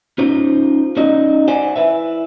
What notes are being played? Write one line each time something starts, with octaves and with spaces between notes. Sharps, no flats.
C#4 D#4 F4 C5
C#4 D#4 F#4 D5 D#5
C5 D5 F#5 G#5
E4 B4 E5